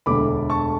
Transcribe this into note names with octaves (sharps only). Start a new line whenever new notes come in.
E1 D2 D3 A3 D4 B5 D6
A5 C#6